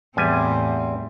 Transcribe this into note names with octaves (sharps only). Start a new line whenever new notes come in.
E2 A2 G3 C4 G#5